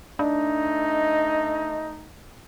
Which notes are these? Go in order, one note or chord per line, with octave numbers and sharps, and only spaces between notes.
A3 D4 D#4 D#5